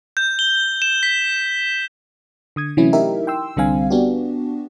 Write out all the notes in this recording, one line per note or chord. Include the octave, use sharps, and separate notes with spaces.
G6
G7
E7
B6
D3 D#6 G#6
C3 E3 F#3 A3 C#4 E4
D#4 E4 G4 A#4 E5
G5 C6 E6
C2 D3 G3 C4 F5 G#5
B3 D4 F#4 G4